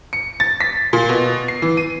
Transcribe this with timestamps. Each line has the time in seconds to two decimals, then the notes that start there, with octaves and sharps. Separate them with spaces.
0.13 C#7
0.40 A6
0.61 B6
0.93 A#2
1.09 B2
1.48 C7
1.62 E3
1.77 D#7